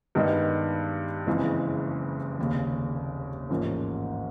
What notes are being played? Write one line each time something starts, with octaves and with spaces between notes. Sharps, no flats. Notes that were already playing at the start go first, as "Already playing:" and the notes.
G2 D#3 G#3 B3 D#4
F#1 F2 C#3 E3 G#3
F1 D#2 C#3
A1 G#2 F3 A#3 C#4